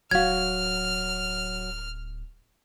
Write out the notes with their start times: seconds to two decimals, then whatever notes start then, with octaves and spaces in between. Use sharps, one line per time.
0.11 D1 F#3 F#4 F5 F6 G#6